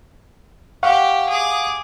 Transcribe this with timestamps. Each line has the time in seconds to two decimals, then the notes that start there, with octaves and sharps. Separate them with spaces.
0.83 G4 F5 F#5 C#6
1.29 G#4 D6